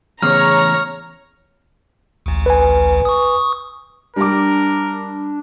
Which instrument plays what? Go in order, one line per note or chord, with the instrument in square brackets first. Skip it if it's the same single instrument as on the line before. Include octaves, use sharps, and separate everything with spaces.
[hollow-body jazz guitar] E2 A2 C#3 [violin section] C#5 A#5 [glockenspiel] F6
[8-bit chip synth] A1 D2
[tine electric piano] B4 G#5
[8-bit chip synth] C#6 D#6
[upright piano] G3 D6 [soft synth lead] D4 [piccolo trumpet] A#4